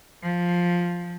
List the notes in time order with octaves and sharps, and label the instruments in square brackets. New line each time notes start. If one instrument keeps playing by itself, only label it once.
[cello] F3